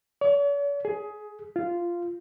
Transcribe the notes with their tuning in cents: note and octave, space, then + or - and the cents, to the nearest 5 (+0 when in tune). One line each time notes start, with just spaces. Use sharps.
C#5 +45
G#4 +15
F4 -10